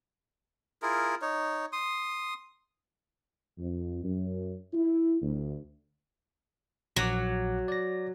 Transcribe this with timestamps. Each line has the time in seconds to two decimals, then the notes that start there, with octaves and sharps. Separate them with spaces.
0.82 E4 F4 G#4 A#4
1.22 D#4 C#5
1.73 C6 D#6
3.58 F2
4.04 F#2
4.74 E4
5.22 D2
6.96 A#1 F#3 F#5 D6
7.68 D5 A#6